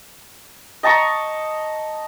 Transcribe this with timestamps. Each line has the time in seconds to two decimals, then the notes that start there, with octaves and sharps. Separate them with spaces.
0.83 D#5 A5 A#5 C#6